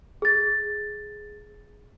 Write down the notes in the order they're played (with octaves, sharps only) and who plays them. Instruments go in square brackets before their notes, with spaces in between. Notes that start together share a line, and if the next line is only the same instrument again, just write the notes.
[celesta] G#4 A6